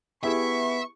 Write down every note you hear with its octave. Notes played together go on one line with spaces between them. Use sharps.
B3 E4 G4 G#4 E5 C#6